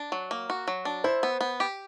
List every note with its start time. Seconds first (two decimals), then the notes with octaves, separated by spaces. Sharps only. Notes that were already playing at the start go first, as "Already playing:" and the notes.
Already playing: D4
0.12 F#3
0.31 A#3
0.50 F#4
0.68 F#3
0.85 D4
1.04 E4 C5
1.23 B3
1.41 B3
1.60 G4